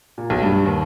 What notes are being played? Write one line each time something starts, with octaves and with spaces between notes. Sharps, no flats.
A#2
B1
G2
D#2